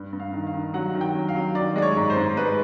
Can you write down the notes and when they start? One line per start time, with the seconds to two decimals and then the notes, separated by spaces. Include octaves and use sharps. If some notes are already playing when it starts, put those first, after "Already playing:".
Already playing: G2
0.13 G2
0.20 F5
0.33 D#3
0.47 F5
0.54 D#3
0.74 F#3 F#5
0.94 D#3
1.01 G5
1.15 F#3
1.28 F5
1.35 F#3
1.55 D#3 D5
1.76 G#3 D5
1.82 C#5
1.97 G#2
2.10 C5
2.16 G#2
2.37 G#3 B4